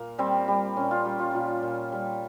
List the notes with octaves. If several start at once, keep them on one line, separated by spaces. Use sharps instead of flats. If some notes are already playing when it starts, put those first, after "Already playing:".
Already playing: A#2 A#3
G3 C4
G3
A#2 C#4
F4
G3 G4
F4
A#2 F4
A#2
G3